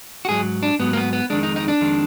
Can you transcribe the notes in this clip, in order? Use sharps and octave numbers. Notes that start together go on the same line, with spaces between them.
F#4
G#2 F#3 G#4
D4
G#2 F#3 B3
A#3
B3
B3
F2 D#3 G#3 D4
D#4
D#4
D4
F2 D#3 G#3